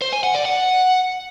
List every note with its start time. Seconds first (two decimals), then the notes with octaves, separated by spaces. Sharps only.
0.02 C5
0.12 G#5
0.23 F#5
0.34 D5
0.45 F#5